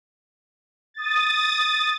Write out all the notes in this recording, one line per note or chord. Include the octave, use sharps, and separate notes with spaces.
D#6 A6